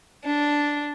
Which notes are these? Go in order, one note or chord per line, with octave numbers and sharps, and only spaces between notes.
D4